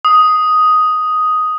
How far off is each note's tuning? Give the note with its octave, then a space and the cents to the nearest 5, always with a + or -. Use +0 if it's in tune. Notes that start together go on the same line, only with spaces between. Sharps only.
D#6 +5